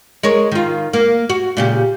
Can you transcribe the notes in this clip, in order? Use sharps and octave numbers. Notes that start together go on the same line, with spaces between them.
G#3 A#4 C#5
D#3 F4
A#3
F#4
A#2 C#3 G4